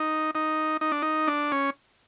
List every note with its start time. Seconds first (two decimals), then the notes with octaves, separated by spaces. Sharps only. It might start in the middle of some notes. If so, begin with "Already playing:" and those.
Already playing: D#4
0.35 D#4
0.81 D#4
0.92 D4
1.02 D#4
1.27 D4
1.52 C#4